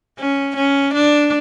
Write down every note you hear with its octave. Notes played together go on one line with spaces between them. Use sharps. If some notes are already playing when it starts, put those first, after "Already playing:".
C#4
C#4
D4